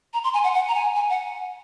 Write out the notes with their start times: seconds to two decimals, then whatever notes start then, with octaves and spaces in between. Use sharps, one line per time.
0.14 A#5
0.24 C6
0.34 G#5
0.44 F#5
0.54 F#5
0.68 A#5
0.75 G#5
0.96 G#5
1.09 F#5